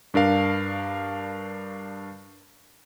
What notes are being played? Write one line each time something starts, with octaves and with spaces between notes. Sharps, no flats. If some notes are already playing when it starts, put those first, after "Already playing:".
G2 D4 A#4 F5